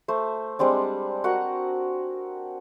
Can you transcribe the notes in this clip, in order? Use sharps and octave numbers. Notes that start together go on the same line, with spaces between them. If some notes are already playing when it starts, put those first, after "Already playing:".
A3 C5
G3 G#3 C4 D4
F#4 A#4 F#5